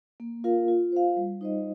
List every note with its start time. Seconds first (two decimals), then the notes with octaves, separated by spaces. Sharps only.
0.20 A#3
0.44 F4 A#4 F5
0.68 F4
0.92 C5 F5
1.17 G3
1.41 D#4 C5 D#5